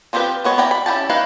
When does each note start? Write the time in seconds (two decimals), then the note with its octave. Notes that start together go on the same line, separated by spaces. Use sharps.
0.13 F3 C4 F4 G4 B4
0.44 G#3 B3 C#5
0.58 E4 A#4 D5 G5 A#5
0.71 B5
0.86 C#4 E4 F#4 G4 A5
1.10 D#4 E4 B4 C#5 F5